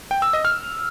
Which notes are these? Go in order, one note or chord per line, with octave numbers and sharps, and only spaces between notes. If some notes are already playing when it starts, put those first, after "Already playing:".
G5
E6
D#5
F6